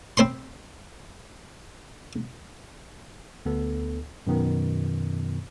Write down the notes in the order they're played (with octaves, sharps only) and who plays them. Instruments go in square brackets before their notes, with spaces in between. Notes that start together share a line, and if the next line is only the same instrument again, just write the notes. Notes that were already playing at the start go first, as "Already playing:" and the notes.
[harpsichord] C4 C5 B5 C6
[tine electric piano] D2 B3 A4
F#2 B2 D#3 B3